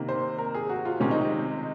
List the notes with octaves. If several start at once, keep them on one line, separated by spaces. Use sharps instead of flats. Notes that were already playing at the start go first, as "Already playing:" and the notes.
Already playing: C3 D#3 A#3
C5
A#4
G#4
F#4
F4
C3 D#3 G#3 C4 C#4
D#4
D#4